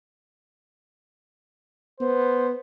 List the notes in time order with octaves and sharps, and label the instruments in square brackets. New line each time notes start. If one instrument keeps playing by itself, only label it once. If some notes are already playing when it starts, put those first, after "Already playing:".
[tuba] B3 [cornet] C5